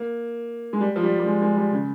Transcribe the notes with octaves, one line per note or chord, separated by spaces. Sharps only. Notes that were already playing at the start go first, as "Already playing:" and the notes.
Already playing: A#3
G#3
G3
F3
G3
G3
G#3
G#3
G3
C#3